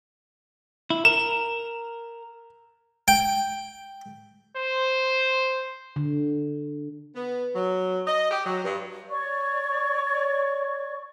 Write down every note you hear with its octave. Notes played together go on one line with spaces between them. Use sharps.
E4
A#4 E7
G5
C5
D3
B3
F#3
D#5
G4
F#3
G2
C#5 D5 C#6